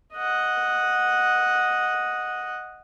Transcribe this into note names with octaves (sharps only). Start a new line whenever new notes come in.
D#5 F#5